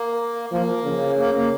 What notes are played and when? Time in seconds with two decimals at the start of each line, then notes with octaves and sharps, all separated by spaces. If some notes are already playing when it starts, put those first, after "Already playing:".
Already playing: A#3
0.52 F3 A#3
0.85 C#3
1.19 A#3
1.35 A#3